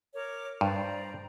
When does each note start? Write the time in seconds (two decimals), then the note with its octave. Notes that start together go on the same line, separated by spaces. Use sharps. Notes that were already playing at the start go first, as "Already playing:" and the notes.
0.14 A#4 C#5 D6
0.61 G2 C5 D5 A#5